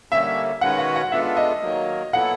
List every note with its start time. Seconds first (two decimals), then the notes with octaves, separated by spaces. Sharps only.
0.11 D3 G3 A#3 C#4 E5
0.61 D#3 G#3 C#4 F#4 B4 F#5
0.79 F#5
0.95 F#5
1.12 G#3 B3 D4 F4 A4 E5
1.37 D#5
1.62 D#3 F#3 A#3
2.13 A#2 F#3 B3 E4 A4 F#5